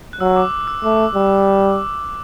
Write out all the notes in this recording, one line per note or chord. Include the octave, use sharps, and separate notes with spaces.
F#6
F#3 E6
E6
D6
D6
E6
A3 D6
G3